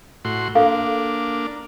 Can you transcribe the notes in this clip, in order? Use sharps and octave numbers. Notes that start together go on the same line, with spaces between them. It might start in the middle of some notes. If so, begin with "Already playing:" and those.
A2 F#4 C6
A#3 D4 A4 F5